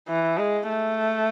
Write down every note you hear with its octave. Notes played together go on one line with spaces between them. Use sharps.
E3
G#3
A3